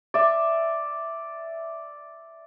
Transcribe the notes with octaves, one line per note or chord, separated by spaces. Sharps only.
D5 E5